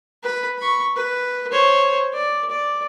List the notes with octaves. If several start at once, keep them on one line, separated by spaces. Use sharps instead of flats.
B4 B5
B5 C#6
B4
C5 C#5
D5
D5